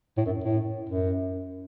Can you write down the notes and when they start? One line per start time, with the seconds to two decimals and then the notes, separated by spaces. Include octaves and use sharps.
0.17 A2
0.26 F#2
0.44 A2
0.89 F#2